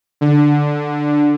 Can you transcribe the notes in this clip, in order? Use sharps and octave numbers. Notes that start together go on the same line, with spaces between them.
D3